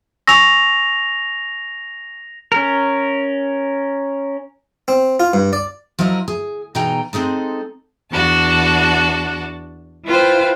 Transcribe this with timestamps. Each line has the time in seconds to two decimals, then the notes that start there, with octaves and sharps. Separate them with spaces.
0.27 G#5 C#6 E6 A#6 F7
2.52 C#4 A#4
4.88 C4
5.20 F4
5.33 G2
5.53 D5
5.99 F3 F#3 E4 A#4 D#5
6.28 G#4
6.75 B2 E3 D#4 G#4 G5 A#5
7.13 G#3 C4 D#4 G#4 A4
8.10 E2 D4 F#4 A5
10.06 E4 F4 B4 C5 G5